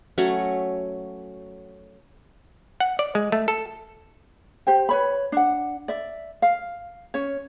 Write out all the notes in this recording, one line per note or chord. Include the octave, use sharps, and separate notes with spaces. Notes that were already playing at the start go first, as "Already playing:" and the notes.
F#3 A3 C#4 C#5
F#5
D5
G#3
A3
A4
G4 C5 G5
B4 C#5 B5
D4 F#5
D5 E5
F5
C#4 C#5